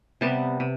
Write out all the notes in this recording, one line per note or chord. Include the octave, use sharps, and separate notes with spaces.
C3 G3 B3 A5
C3